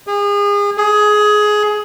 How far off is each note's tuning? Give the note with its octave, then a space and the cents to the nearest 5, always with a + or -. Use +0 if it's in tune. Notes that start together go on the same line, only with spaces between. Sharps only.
G#4 -35
G#4 +15